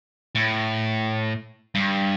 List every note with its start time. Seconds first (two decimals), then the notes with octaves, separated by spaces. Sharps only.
0.35 A2
1.75 G2